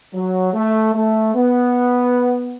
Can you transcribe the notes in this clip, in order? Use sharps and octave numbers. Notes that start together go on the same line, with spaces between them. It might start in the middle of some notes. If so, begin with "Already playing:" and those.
F#3
A3
A3
B3